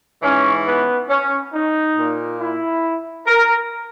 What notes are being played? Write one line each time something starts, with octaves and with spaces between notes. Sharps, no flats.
G#2 E3 C#4
B3
C#4
D#4
A#2
E4
A#4